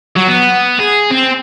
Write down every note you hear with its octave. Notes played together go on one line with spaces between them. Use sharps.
F#3
B3
G#4
C4